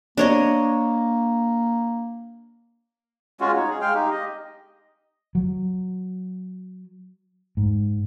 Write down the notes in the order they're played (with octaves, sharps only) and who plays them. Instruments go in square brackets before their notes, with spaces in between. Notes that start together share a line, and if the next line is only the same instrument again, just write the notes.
[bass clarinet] A#3 [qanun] D4 C#5 D#5
[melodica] G#3 C#4 F4 F#4
D#4 C#5
G#4
G#3 F5 G5
D#4 G4
D#5
[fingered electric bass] F#3
G#2